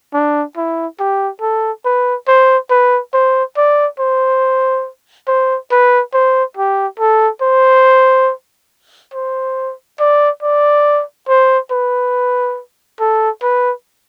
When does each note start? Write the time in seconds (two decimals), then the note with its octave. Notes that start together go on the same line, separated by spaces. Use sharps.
0.14 D4
0.57 E4
0.99 G4
1.41 A4
1.85 B4
2.28 C5
2.70 B4
3.13 C5
3.57 D5
3.99 C5
5.27 C5
5.71 B4
6.13 C5
6.57 G4
6.99 A4
7.42 C5
9.13 C5
10.00 D5
10.43 D5
11.28 C5
11.71 B4
13.00 A4
13.42 B4